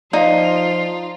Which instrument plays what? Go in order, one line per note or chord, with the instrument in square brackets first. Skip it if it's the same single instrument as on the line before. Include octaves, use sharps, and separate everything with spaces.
[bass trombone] F3 [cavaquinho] D#4 [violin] F4 [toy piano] D5 F5